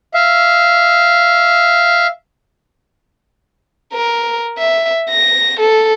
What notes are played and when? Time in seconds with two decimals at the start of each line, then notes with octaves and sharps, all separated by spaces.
0.14 E5 F5
3.94 A#4
4.58 E5
5.10 A#6
5.60 A4